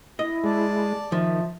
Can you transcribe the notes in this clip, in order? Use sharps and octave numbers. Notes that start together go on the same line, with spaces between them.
E4 D#5
G#3 D5 A5
D#3 F3 E5